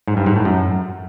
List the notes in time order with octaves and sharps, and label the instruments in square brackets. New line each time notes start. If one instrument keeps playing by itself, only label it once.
[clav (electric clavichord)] G#2
G2
G#2
A2
F#2